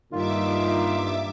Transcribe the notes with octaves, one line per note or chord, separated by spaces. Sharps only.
G2 A#2 D#3 D#4 F4 E5 D6